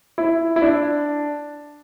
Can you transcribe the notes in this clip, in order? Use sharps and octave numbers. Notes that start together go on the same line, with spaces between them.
E4
E4
D4